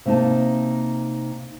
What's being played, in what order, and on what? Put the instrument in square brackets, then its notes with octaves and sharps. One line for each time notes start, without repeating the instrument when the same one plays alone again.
[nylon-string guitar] C3 A#3 D#4 A5